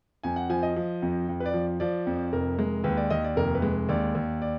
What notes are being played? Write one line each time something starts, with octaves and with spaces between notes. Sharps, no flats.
F2 G#5
F#5
F3 G#5
D#5
F3
F2
F2
B4
D5
F3
F3 D5
F2
F1 A#4
G#3
D#2 B4
D5
D#2 D#5
D5
F1 A#4
B4
G#3
D#2 D5
D#2
D5